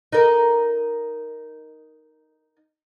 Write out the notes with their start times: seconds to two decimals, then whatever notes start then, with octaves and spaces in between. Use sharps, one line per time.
0.13 D#4 A#4